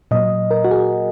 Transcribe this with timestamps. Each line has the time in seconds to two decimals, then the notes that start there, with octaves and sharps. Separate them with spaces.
0.11 A#2 F#3 A#3 D#5
0.51 A#4
0.64 F#4
0.71 G#4